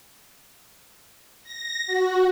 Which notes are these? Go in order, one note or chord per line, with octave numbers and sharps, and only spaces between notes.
A#6
F#4